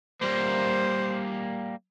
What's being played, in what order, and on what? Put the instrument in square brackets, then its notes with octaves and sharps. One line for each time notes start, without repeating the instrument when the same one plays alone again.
[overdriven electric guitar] G3 A#3 [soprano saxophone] C5